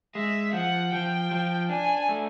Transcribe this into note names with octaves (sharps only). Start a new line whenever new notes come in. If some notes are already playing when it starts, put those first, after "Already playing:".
G#3 E5
F3 F#5
F3 G5
F3
D4 G#5
A3